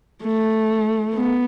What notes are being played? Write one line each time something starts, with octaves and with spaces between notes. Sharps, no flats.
A3
B3